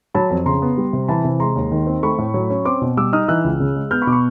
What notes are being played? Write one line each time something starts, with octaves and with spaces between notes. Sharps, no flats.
F#3 A5 B5
F2
C#3 A#5 C6
B3
G3
C3
E3 A5 B5
C3
G#3 A#5 C6
D#2
D#3
C4
A3 B5 C#6
A2
F#3
C#4
C4 C6 D6
B2
G3 D6 E6
D#4 D#6 F6
E3 E6 F#6
C#2
C#3
G#3
B3 F6 G6
B5 C#6
B2 D6
B5 C#6